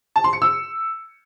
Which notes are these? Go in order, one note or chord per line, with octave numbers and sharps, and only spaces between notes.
A5
C6
C#7
E6